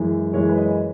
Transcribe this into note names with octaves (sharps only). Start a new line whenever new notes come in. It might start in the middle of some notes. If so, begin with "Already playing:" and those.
Already playing: F#2 E3 G#3
F#2 E3 G#3 C#5
B4
D#5
C#5